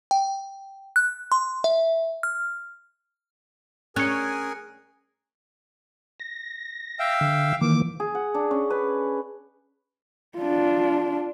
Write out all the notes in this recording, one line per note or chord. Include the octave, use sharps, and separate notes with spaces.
G5
F#6
C6
E5
F6
C#4 G#4 A#4 G#5 F#6 C#7
A#6
E5 F5 G5
D3
D#3 E3 A#3 D6
G#4
F#5
D4
C#4
B4
D4 F4